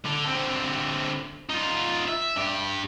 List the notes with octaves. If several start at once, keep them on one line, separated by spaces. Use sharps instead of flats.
D3
D3 C4
D#4 F4
E5
G2 G4